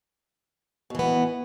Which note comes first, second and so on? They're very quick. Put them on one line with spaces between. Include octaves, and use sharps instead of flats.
B2 E3 B3